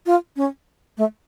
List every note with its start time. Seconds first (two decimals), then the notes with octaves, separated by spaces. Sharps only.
0.06 F4
0.37 C#4
0.98 A3